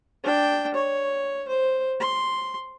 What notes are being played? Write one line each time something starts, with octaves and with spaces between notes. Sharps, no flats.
D4 G5
C#5
C5
C6